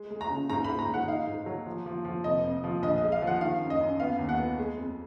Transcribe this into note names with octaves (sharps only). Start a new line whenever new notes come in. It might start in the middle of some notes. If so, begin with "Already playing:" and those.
Already playing: G#3
G#3
A#5
C#3
G#2 A#5
B5
G#2
A#5
G#2 F#5
D#4 F5
G#2
F#3
F3
F3
F3
F1 D#5
F2
F3
A#1 D#5
D#5
G#3
F5
F3
F#5
D#3 F5
F#2
D#5
F#2
B3 F5
D#2
F#5
B3
G#3
F2